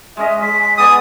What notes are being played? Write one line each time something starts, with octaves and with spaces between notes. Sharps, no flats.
G#3 C#4 D#5 E5
G#3 B6
G#3 B3 D5 G#5 D#6